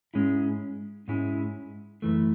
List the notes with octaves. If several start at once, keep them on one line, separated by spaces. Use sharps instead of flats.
G#2 G#3 C#4 E4
G#2 G#3 C#4 E4
F#2 E3 A3